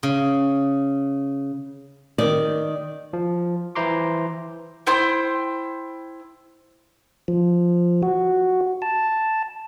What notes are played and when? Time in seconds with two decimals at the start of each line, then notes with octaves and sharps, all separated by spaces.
0.03 C#3
2.18 D#3 D5
3.13 F3
3.75 E3 E4 C5 A#5 C6 D6
4.87 E4 C5 G5 C6
7.28 F3
8.03 F#4
8.82 A5